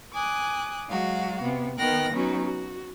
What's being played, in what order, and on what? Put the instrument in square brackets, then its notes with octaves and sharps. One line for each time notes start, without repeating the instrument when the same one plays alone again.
[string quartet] G#5 D6 D#6 F#6
F#3 G#3 F#4 F5
C3 B3
D#3 B3 G5 F6 F#6 A#6
F#3 B3 C#4 D#4 F#4
F#4